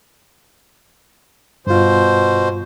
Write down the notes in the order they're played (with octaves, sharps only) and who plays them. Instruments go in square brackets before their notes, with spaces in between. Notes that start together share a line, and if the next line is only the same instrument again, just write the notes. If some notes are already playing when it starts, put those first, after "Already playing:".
[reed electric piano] G2 F4 [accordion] B2 C5